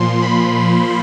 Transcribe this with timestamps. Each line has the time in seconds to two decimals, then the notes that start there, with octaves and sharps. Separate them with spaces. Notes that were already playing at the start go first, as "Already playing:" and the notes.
Already playing: A#2 F3 C6
0.22 B5